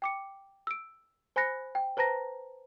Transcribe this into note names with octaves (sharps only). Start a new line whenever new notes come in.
G5 D6 C#7
E6 D7
C5 G#5 B5 F#6 A#6 C#7
G5
B4 C5 A5 A#5 A#6